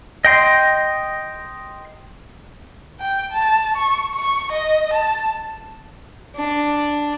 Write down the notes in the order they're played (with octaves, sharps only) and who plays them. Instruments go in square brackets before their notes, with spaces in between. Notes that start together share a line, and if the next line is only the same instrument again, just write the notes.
[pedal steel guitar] D#5 G5 C6
[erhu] G5
A5
C#6
C#6
D#5
A5
[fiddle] D4